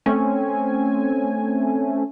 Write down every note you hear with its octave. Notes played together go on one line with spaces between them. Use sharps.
A3 C4 C#4 G#5